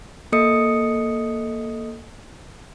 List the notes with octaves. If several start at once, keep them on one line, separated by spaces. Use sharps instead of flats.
A#3 A4 D#5 D#6 C#7